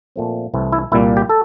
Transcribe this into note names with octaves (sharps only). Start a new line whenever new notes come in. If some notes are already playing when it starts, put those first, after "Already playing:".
A#2 F3 A3 C4
C2 C3 E3 A3
E4
C2 A#2 G3 A#3 E4
G4
A4